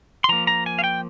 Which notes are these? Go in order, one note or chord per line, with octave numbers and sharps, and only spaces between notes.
C6
F3 A#3 A#5
A#5
G#5
F5
G5